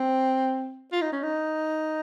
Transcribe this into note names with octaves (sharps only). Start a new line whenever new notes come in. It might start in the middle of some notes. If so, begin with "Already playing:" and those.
Already playing: C4
F4
D#4
C#4
D#4